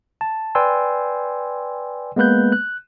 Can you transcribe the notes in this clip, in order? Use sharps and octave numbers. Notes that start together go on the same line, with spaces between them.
A5
B4 D5 G5 G#5 C6 E6
G#3 A#3 B3 B4 F#6 G6
F#6